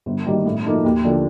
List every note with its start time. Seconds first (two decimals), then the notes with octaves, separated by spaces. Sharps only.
0.06 G1
0.25 G2 D#3 A#3
0.45 A2
0.64 F3 A#3 D#4 A4
0.84 D#2
1.03 D3 F3 A#3